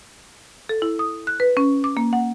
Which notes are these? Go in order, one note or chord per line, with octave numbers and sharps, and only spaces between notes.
A4
E4
D#6
F#6
B4
C#4
D6
A#3
F#5